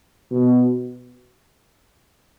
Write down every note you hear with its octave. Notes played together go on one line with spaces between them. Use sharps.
B2